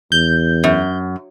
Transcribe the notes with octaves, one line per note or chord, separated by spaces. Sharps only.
E2 G6
F#2